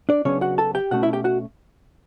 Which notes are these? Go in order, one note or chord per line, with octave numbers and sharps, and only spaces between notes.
D4 D5
C#3 F#3 B3 C#4 D4 C#5
F#4 F#5
A4 A5
G4 G5
B2 A3 C#4 F#4 F#5
E4 E5
G4 G5
F#4 F#5